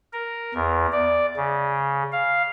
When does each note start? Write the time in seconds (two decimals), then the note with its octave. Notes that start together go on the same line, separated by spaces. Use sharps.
0.13 A#4
0.54 E2
0.92 D5
1.36 C#3
2.12 F5